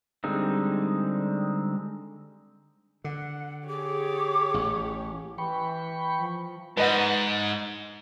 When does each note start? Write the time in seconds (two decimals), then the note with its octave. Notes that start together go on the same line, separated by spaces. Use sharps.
0.24 D3 G3 G#3 C4 D#4
3.04 D3 F#5
3.68 G4 G#4 C#5 D6
4.54 A1
5.38 E3 G5 B5 C#6
6.19 F3
6.77 G#2 B4 D#5 F#5